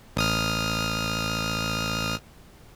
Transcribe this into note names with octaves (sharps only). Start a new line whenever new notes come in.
A1 D#6 F6